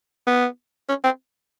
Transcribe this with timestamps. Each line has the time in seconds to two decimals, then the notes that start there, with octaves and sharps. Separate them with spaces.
0.27 B3
0.89 C#4
1.04 C4